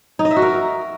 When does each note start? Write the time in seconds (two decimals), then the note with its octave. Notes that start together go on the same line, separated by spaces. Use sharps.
0.19 D#4
0.25 D#5
0.31 E5
0.36 F#4
0.42 A#4